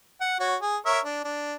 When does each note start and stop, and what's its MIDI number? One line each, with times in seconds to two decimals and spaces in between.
0.21 0.38 78
0.40 0.55 66
0.40 0.55 73
0.62 0.77 68
0.86 0.99 70
0.86 0.99 73
0.86 0.99 76
1.05 1.23 62
1.24 1.55 62